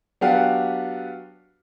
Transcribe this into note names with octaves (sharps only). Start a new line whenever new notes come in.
F#3 B3 D4 F#4 G4 F5